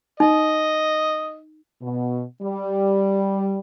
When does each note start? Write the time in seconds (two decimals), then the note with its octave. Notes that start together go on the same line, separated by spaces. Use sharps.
0.20 D#4 D#5
1.82 B2
2.42 G3